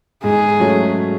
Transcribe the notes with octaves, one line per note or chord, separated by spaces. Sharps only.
G#2 G#4
F#3 A3 C#4